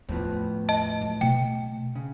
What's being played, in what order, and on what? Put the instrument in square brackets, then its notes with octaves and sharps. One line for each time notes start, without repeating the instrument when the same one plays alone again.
[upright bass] E2 [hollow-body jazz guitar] A2 F3 B3
[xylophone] D#5 A5
[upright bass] F#3 E4
[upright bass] B2 A3 [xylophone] G5
[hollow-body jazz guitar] C#3